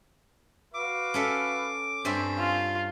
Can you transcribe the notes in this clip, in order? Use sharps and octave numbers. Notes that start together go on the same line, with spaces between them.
F#4 B4 F5 D6
C#4 A4 E5
G2 G3 C4 C#4 E5
F4